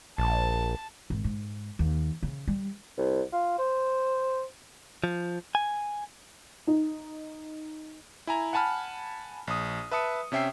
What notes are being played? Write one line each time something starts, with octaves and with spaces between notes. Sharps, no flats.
A#1 A5
G#1
G#2
D#2
C#3
G3
C2
F4
C5
F3
G#5
D#4
E4 G#5 A#5
F#5 G#5 A5 B5 F6
A#1 D#6
B4 E5 A5 D#6 C#7
C3 C#4 E5 G5 C7